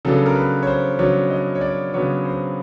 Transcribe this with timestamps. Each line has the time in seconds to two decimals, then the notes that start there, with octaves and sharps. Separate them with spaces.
0.05 C#3 F#3 B3 D4 A4
0.26 A#4
0.36 B4
0.62 C#5
0.67 C5
0.99 C#3 F#3 B3 D4 C#5
1.30 D#5
1.55 C#5
1.61 D5
1.93 C#3 F#3 B3 D4 C#5
2.25 C5